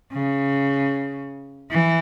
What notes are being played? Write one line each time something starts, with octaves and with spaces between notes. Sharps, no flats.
C#3
E3